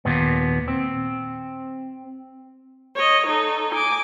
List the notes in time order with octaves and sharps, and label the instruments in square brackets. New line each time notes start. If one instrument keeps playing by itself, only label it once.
[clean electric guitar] D#2 A#2 B3
C4
[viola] C#5 D#5
D#4 A4
G#5 D6